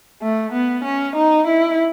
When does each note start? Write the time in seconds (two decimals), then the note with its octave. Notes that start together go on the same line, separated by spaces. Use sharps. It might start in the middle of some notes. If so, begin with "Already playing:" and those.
0.22 A3
0.53 B3
0.84 C#4
1.16 D#4
1.48 E4